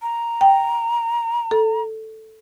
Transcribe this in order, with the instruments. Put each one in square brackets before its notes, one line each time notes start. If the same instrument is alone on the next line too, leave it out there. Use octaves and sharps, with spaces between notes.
[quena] A#5
[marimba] G5
A4